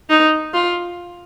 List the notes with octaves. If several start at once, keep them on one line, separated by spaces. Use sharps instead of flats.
D#4
F4